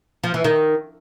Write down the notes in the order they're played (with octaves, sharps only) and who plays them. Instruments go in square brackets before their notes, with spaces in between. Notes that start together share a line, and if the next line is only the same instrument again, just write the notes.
[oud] F3
E3
D#3